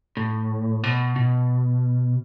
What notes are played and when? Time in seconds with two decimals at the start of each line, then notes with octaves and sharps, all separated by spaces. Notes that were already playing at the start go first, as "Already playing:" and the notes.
0.17 A2
0.83 B2
1.16 B2